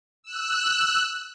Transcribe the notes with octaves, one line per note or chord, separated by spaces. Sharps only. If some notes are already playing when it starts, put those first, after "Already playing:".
E6 F#6